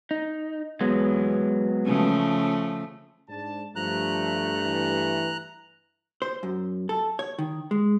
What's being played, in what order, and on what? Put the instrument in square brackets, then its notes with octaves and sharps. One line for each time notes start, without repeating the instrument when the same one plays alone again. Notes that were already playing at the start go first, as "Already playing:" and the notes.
[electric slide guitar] D#4
[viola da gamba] E2 [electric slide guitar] F#3 G#3 B3
[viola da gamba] C#3 F3 A3
[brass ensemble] G#2 D4 A5
[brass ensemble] G2 A3 [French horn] F3 [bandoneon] A#5 F#6
[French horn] E3
[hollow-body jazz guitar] C5
F#2
A4
C#5
D#3
G#3